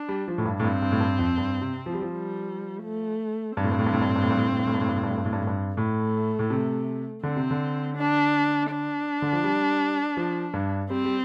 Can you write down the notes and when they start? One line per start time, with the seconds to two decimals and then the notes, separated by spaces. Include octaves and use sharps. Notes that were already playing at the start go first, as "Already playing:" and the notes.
Already playing: D4
0.09 G3
0.28 F3
0.38 A2
0.45 G2
0.60 A2
0.64 G2 C4
0.82 G2
0.92 A2
1.01 G2
1.19 F2
1.38 G2
1.62 C3
1.86 F3
1.94 G3
2.01 F3
2.10 G3
2.84 A3
3.57 G2 C4
3.64 A2
3.72 G2
3.79 A2
3.86 G2
3.94 A2
4.01 G2
4.09 A2
4.15 G2
4.23 A2
4.30 G2
4.37 A2
4.45 G2
4.52 A2
4.59 G2
4.67 A2
4.74 G2
4.81 A2
4.88 G2
4.96 A2
5.03 G2
5.10 A2
5.18 G2
5.25 A2
5.33 G2
5.40 A2
5.47 G2
5.77 A2 A3
6.39 A2
6.50 C3
7.23 D3 C4
7.37 C3
7.51 D3
7.97 D4
8.71 D4
9.22 D3
9.33 F3
9.44 G3
10.17 F3
10.54 G2
10.90 G3 C4
11.05 G3